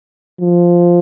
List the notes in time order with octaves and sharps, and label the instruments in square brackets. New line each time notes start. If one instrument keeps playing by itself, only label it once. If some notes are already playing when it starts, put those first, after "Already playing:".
[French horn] F3